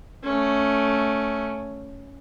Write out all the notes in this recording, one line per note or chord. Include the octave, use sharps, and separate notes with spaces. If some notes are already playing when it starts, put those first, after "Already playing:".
A3 C#4